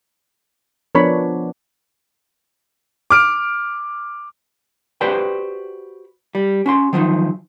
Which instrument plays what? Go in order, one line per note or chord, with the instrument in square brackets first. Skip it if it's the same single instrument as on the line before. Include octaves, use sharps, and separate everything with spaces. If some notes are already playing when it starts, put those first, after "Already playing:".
[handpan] F3 B3 D4 [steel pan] A#4 C#5 B5
[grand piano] D6 F6 D7
[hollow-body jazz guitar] F#4 G4 B4 C5 D5 G5
G3
C#4 F#4 C6
D#3 F3 F#3 D#4